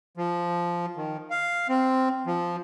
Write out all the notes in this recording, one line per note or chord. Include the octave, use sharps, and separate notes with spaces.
F3
D#3
F5
C4
F3